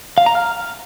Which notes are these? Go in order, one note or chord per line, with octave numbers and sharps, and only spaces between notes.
F5
A#5
F6